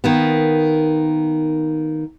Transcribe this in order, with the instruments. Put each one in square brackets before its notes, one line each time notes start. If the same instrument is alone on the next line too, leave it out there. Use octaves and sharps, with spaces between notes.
[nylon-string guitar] D#3 A#3 B3